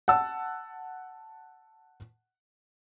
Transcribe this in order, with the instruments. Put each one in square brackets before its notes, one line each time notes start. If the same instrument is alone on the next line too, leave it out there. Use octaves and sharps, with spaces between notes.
[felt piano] F#5 A5 E6